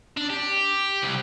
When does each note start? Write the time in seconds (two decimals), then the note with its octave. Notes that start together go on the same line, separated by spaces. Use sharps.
0.17 D4
0.30 G4
1.03 C2